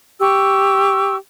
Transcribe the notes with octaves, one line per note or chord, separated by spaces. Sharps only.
G4 C#6 E6